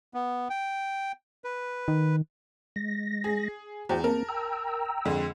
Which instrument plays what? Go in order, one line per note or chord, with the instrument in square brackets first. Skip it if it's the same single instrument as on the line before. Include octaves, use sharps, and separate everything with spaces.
[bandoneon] B3
G5
B4
[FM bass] D#3
[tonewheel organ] G#3 A#6
[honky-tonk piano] G#4
[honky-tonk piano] E2 [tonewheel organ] F#4 C5 G5
[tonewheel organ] A#3 C4 [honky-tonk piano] A#4 A5
[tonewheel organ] G5 A#5 E6
[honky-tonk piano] F2 D3 G#3